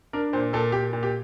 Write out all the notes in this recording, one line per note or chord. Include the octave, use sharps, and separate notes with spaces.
D4 A#4
A#2 C5
A#2 A4
A#2 G4
A#2
G4